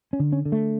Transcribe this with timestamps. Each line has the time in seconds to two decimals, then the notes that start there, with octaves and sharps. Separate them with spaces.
0.13 C#4
0.20 D3
0.32 C#4
0.45 D3
0.52 A3